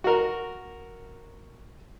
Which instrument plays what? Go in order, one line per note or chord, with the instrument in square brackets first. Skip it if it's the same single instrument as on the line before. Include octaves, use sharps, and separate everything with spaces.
[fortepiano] F#4 A#4